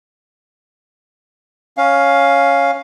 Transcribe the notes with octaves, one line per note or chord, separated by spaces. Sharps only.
C#4 F5